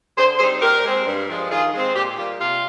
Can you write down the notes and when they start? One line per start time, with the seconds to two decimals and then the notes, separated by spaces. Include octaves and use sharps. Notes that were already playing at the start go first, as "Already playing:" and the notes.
0.17 D3 G#4 C5
0.39 G3 C4 D#4 G#4 C5
0.62 A#2 G4 A#4
0.84 G#3 C4
1.06 G2
1.28 F3 G#3
1.50 D#3 F4 G#4
1.73 G#3 C4
1.94 A#2 G4
2.17 G3 A#3 F4 G4
2.40 C3 F4